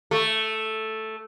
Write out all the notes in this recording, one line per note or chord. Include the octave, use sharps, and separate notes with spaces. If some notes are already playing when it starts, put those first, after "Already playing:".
A3